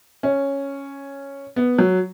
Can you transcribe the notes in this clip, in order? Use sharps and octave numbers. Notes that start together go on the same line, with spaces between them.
C#4
B3
F#3